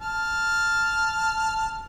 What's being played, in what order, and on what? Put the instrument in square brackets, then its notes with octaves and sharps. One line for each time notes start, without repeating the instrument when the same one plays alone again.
[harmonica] A5 F6